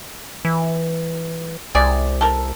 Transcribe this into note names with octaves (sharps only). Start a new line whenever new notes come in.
E3
C2 G#4 D5
A4 A#4